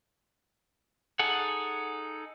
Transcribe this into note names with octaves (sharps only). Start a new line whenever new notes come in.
D#4 G#4 A4 F#5